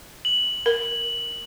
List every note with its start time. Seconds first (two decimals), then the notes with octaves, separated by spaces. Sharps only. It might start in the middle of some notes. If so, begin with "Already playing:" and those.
0.25 F#7
0.66 A#4